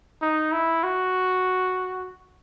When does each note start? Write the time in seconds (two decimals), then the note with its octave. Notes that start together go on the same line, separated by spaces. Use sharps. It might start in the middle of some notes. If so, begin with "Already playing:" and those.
0.22 D#4
0.52 E4
0.84 F#4